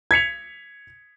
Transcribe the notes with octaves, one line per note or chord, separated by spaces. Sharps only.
G#6 B6 C#7 F7